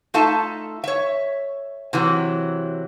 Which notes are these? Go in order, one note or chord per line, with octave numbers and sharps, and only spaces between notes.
A3 D#4 F4 A4 E5 A5
C#5 E5
C3 E3 F#3